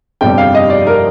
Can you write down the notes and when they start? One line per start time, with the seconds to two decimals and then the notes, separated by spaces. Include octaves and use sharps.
0.21 G1 F2 C3 G3 G5
0.38 F5
0.55 D#5
0.70 D5
0.87 A#4